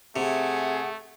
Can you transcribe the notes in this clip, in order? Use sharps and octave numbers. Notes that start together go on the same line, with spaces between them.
C3 A3 G#4 F#5